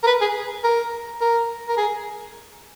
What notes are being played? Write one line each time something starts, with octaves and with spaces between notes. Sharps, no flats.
A#4
B4
G#4
A#4
A#4
A#4
G#4